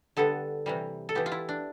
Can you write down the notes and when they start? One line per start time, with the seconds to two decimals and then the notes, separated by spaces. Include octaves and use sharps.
0.17 D3 G3 B3 A4
0.66 C3 E3 G3
1.09 A4
1.15 E3 B3 G4
1.26 F4
1.32 E4
1.49 D4